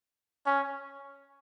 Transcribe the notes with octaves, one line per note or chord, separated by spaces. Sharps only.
C#4